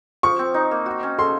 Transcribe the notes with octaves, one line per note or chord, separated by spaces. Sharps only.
F3 C#6
C4
D#4
A#3
F#4
C#4
A4 C6